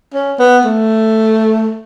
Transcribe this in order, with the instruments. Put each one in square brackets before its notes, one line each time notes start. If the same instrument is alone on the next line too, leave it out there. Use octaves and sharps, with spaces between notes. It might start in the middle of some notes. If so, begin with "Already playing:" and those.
[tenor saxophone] C#4
B3
A3